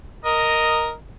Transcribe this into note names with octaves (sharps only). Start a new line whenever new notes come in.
A#4 D#5